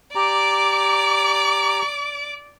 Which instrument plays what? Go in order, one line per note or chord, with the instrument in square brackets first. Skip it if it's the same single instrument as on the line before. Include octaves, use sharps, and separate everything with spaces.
[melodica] G4 A#5 [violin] D5 D6